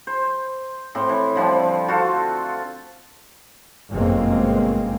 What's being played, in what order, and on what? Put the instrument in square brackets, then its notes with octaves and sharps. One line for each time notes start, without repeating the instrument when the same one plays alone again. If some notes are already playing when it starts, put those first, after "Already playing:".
[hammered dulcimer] C5
A2 C4 C6
E3
D3 F3 G3 C4
F4 F#4 A4 C5
[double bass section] G1 F#2 B2 G#3 A#3 C4